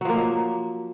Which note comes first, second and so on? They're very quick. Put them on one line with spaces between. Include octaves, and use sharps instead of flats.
F#3 F3 A#3